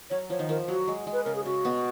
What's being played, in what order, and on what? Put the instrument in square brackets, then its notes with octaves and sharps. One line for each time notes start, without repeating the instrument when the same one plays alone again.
[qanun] F#3 [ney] C#5
[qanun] F3 [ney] C#5
[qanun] D#3
[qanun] F3 [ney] A#4
[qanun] F#3 [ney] F#4
[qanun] G#3
G#3
[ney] B4
[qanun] C#3 [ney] A#4
[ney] G#4
[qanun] C#3 [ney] F#4
[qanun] B2 B3